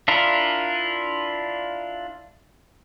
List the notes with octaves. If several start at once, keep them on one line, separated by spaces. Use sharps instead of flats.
D4 E4 F4 A#4